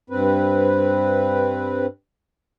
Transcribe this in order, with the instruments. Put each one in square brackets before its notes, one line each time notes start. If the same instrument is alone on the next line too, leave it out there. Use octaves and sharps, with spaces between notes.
[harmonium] G2 C4 B4